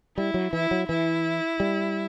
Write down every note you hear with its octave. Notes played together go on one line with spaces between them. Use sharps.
G3 E4
F#3
E3 E4
F#3
E3 E4
G3